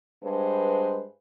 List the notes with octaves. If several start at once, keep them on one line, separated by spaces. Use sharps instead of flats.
G2 G#3 B4 C5